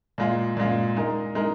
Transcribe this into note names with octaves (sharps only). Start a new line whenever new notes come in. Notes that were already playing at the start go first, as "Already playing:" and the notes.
A#2 G#3 F4
A#2 G#3 F4
G#3 D#4 A#4
G#3 D#4 A#4